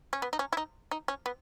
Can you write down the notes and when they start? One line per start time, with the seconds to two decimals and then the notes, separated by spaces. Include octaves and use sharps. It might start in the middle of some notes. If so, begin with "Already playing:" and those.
0.13 C#4
0.22 B3
0.33 D#4
0.39 C#4
0.53 E4
0.57 D#4
0.91 D#4
1.08 C#4
1.26 B3